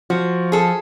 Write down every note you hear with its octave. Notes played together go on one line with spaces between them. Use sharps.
F3 F#4
G#4 A4